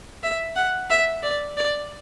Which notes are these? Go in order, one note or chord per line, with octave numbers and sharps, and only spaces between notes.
E5
F#5
E5
D5
D5